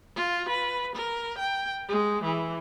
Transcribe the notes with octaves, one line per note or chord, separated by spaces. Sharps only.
F4
B4
A#4
G5
G#3
E3